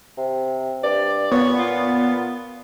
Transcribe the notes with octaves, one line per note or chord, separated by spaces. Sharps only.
C3
G2 D5
A#2 B3 C#5
F4